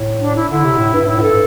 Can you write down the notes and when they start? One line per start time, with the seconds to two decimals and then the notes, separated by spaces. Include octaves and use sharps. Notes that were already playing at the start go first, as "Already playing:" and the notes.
Already playing: A2
0.21 D4
0.36 E4
0.50 D3 E4
0.64 C3
0.78 A2
0.93 G2
1.07 A2 E4
1.18 A2
1.22 G2 A4